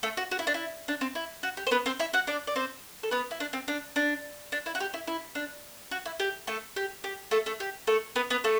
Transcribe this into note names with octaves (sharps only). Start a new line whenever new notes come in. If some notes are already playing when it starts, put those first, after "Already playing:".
A3 A4
F#4
F#4
E4
D4
E4
D4
C4
E4
F#4
G4
C5
B3 B4
C4 C5
E4 E5
F#4 F#5
D4 D5
D5
C4 C5
A4
B3 B4
E4
D4
C4
D4
D4
D4
E4
F#4
G4
E4
E4
D4
F#4
E4
G4
A3 A4
G4
G4
A3 A4
A3 A4
G4
A3 A4
B3 B4
B3 B4
A3 A4